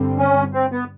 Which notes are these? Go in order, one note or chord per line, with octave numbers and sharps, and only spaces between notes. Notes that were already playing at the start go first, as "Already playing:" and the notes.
Already playing: G2 D3 G3 C4
C#4
C4
B3